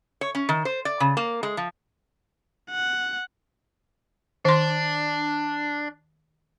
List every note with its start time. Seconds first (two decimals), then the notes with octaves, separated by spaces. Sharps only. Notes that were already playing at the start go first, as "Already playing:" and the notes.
0.21 C#5
0.35 C#4
0.49 D#3
0.65 C5
0.85 D5
1.00 C#3
1.17 A#3
1.43 G#3
1.57 F3
2.71 F#5
4.45 D#3 D4 C6